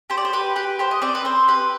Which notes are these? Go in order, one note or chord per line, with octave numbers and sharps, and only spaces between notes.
G4 C5
D5
C5
G4 B4
G4 B4
G4 C5
D#5
C4 D5
B4
C4 C5
G4 B4